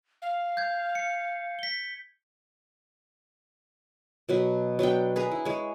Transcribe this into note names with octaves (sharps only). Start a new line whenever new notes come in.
F5
G6 G#6
C#7
B6 G7
B2 F#3 B4
F#3 B3 D4 G5
G#4 B4 G#5 A#5
E4
G#3 C#5